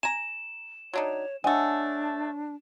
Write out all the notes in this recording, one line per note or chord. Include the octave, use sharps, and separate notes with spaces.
G#5 A#5 E7
F#3 D4 D#4 C#5
A3 D4 C#5 D#5 F#5 G#5